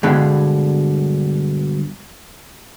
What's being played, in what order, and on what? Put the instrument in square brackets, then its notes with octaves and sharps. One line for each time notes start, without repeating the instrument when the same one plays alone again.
[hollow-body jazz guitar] G2 B2 D3 G3 G#3